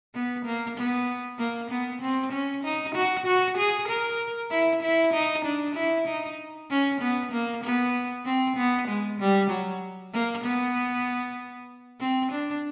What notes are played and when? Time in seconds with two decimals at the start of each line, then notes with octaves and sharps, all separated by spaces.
0.15 B3
0.45 A#3
0.77 B3
1.39 A#3
1.71 B3
2.02 C4
2.32 C#4
2.64 D#4
2.95 F#4
3.26 F#4
3.58 G#4
3.88 A#4
4.51 E4
4.83 E4
5.13 D#4
5.45 D4
5.76 E4
6.08 D#4
6.70 C#4
7.01 B3
7.32 A#3
7.64 B3
8.25 C4
8.57 B3
8.88 G#3
9.20 G3
9.51 F#3
10.13 A#3
10.44 B3
12.00 C4
12.32 D4